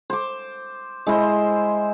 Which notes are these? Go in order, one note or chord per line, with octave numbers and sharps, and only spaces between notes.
C5 D6
G#3 E4 C5